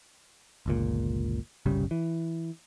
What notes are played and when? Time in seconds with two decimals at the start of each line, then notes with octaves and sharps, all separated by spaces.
0.66 G1 C#2 A#2
1.66 G1 C2 C#3 G3
1.91 E3